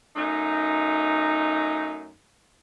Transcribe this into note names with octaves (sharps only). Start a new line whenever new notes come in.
F#2 A3 D#4